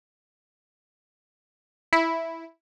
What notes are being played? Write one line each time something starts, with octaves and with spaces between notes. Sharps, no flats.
E4